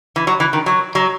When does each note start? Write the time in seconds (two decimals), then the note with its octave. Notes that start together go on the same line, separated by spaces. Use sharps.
0.16 E3
0.27 F#3
0.40 E3
0.53 D#3
0.66 F#3
0.95 F#3